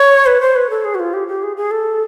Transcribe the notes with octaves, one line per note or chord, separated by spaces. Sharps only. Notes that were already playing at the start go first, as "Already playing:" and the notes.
Already playing: C#5
B4
C5
B4
A4
G#4
F#4
F4
G4
G4
G#4
G#4
A4